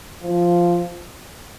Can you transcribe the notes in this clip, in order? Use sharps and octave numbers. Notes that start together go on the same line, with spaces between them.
F3